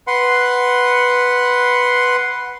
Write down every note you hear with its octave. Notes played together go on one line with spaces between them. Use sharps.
B4 F#5 C6